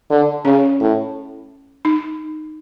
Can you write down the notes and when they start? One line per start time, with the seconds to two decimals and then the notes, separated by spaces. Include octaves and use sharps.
0.10 D3
0.45 C#3 C#4
0.80 A2
1.85 D#4